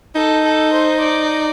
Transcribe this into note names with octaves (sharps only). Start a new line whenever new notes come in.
D#4 A4
A4
C5
D5